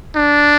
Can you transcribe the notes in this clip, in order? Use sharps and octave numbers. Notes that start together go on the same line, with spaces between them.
D4